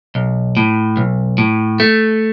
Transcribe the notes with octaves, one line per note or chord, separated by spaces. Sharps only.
B1
A2
B1
A2
A3